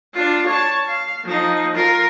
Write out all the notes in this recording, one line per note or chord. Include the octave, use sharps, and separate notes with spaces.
D4 F4
C#5 A5
F5
F3 D#4
F4 A#4